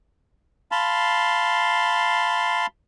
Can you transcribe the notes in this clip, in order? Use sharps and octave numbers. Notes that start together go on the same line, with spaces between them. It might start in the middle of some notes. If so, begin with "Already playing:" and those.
F5 A5 B5 C6